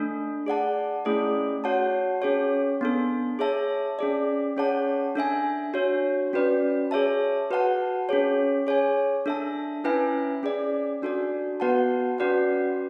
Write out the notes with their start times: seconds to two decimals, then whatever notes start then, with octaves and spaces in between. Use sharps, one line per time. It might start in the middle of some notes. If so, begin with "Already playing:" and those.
Already playing: A3 D4 A4
0.46 G#4 D5 F#5 A5
1.05 A3 C#4 E4 G#4 D5
1.64 F#4 C#5 F#5 A5
2.22 C#4 G#4 C#5
2.81 B3 D4 A4
3.39 G#4 C#5 E5 A5
3.99 C#4 G#4 D5
4.57 C#4 G#4 C#5 F#5 A5
5.15 D4 A4 E5 G#5
5.74 D4 F#4 C#5
6.33 C#4 F#4 B4 D5
6.91 G#4 C#5 E5 A5
7.50 F#4 B4 F#5 A5
8.09 C#4 G#4 C#5
8.67 G#4 C#5 G#5
9.26 D4 A4 E5 A5
9.84 C#4 E4 B4 E5 G#5
10.43 C#4 G#4 D5
11.02 D4 F#4 A4 D5
11.60 B3 F#4 B4 F#5 A5
12.18 C#4 F#4 B4 D5 F#5